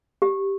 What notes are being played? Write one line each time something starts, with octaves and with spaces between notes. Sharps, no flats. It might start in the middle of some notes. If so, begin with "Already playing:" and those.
G4